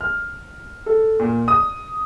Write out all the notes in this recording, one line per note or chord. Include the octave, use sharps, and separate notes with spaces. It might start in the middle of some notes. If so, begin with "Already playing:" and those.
F6
A4
A#2
D#6